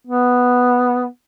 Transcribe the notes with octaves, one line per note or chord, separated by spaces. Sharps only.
B3